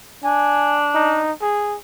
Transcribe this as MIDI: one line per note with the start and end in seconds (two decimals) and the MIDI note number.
0.24 1.20 62
0.24 0.78 80
0.95 1.32 63
1.41 1.77 68